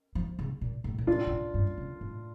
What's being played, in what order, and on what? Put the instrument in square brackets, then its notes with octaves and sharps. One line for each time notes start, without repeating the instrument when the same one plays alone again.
[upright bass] F3
C#3
A#2
A2
A#2
[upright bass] A2 [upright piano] D4 F4
[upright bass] C#3
A#2
G2
C#3
A2